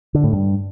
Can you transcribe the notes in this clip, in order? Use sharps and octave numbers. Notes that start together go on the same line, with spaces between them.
D3
A2
G2